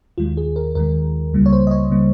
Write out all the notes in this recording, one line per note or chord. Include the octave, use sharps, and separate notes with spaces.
D#2 D#3 G#3 F4
G#4
A#4
D#2 D#3 G#3 A#4
C#2 C#3 G3 A#3
C#5
C5
D#5
C#5
C#3 G3 A#3